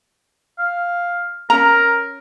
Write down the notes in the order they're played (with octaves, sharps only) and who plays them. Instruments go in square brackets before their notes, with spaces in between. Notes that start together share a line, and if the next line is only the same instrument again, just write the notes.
[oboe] F5
[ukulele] C#4 A#5 [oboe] A#4